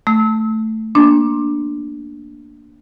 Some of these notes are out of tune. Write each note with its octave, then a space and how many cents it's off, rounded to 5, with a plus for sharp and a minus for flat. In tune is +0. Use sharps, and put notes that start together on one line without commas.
A3 +0 E6 -30
A#3 +15 D4 +0 C6 +35